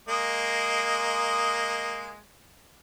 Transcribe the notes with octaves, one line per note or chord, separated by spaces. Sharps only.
G#3 A#3 D#5